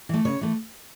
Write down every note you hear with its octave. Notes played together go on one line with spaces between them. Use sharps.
E3 A3
C#3 C#5
E3 A3